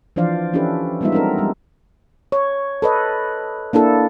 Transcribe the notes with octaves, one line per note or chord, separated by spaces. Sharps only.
E3 F3 D4 C5 D5 F5
C#4 D4 E4 G4 A4 B4
G3 G#3 B3 D#4 F4 E5
C4 D4 D#4 A4 A#4
G3 G#3
C#5
A4 B4 D#5
A#3 D4 E4 A4